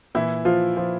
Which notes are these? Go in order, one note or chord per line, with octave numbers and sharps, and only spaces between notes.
A#2 E3 E4
F3 F4
F3 F4